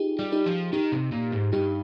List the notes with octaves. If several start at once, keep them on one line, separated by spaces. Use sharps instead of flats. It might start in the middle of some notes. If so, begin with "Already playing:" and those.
Already playing: D#4 F4 G4 G#4
G3
D#4 G4
F3
D#3 D#4 G4
C3
A#2
G#2
G2 D#4 G4